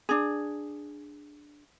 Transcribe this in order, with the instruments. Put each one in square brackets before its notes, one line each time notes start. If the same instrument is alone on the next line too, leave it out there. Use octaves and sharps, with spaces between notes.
[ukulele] D4 G#4